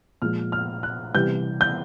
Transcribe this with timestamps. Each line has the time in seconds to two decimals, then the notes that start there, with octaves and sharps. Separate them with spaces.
0.22 A#2 F3 G#3 F6
0.52 F6
0.83 F#6
1.14 C3 E3 G3 G6
1.61 G6